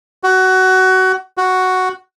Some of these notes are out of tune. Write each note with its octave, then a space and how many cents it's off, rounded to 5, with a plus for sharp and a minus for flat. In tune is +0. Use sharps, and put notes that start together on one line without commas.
F#4 +20
F#4 +5